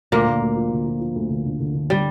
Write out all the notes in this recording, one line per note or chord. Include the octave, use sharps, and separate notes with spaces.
D2 A#2 A#3
D2
D2
F3
D3
F3
F3
D2
D2
D3
D3
D3
D3 G3